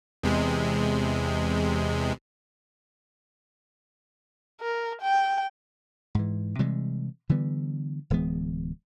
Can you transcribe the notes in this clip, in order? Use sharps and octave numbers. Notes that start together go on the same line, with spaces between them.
E2 C3 G#3
A#4
G5
G#2 E3
C3 E3 G3 G#3
D3 E3 G3 B3
D1 E3 G#3 B3